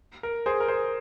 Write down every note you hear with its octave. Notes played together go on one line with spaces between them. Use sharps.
A#4
G#4 C5
A#4
G#4 C5